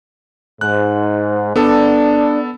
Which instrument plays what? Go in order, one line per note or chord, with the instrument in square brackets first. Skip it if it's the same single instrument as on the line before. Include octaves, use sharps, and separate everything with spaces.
[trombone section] G#2 [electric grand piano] F#6
[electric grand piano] B3 A4 [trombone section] D4